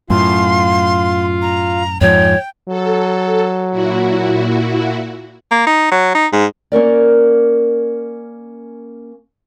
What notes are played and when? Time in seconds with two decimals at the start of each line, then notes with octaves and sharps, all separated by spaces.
0.10 F#2 A2 F4 F5 C6
1.42 A#5
2.01 F2 G#2 F3 C#5 G5
2.68 F#3 A4
3.71 A#2 E4 F#4
5.51 A#3
5.67 D#4
5.92 F#3
6.15 D#4
6.33 G#2
6.72 A#3 C#4 A#4 D5